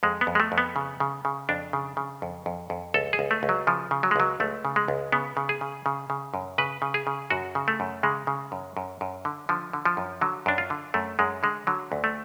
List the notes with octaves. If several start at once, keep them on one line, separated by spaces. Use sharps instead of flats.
F2 G#3
B3
F2
G#3
A3
F2
B3
C#3
C#3
C#3
F2 D4
C#3
C#3
F2
F2
F2
C#2 A4
G#4
C#2
A3
C#2
F#3
C#3 F3
C#3
F#3
G#3
C#2 F#3
C#2 A3
C#3
G#3
C#2
C#3 B3
C#3
G#4
C#3
C#3
C#3
F#2
C#3 B4
C#3
G#4
C#3
F#2 F#4
C#3
A3
F#2
C#3 G#3
C#3
F#2
F#2
F#2
D3
D3 F3
D3
F3
F#2
D3 F#3
F#2 D4
F4
D3
F#2 A3
F#2 G#3
D3 G#3
D3 F#3
D2
A3